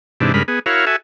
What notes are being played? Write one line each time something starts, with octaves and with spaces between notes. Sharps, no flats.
G#2 C3 E3 D4
G2 C#3 G#3 A#4 B5
B3 G#4
E4 F#4 A#4 C#5 F5
F#4 A4 E5 G#5